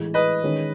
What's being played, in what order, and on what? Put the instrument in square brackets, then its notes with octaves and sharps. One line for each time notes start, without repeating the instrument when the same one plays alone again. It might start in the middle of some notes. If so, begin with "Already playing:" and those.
Already playing: [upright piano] A2 E3 G#3
[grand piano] B4 D#5
[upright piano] D#3 G#3 C#4